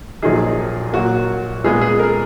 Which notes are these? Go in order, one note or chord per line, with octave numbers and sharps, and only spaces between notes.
A#1 A#2 F#3 A#3 D#4 G#4
A#2 F#3 A#3 F#4
A#2 G#3 B3 F4 G#4
G#4
A#4